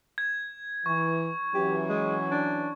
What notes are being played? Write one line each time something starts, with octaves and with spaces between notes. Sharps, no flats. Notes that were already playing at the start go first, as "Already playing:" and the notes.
G#6
E3 C#6
E3 F#3 C#4 G4
G#3
D4